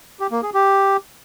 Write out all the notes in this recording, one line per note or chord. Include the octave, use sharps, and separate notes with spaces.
G4
A#3
G#4
G4